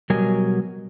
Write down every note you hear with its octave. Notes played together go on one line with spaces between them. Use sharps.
B2 F#3 G3 A#4 D#5 G#5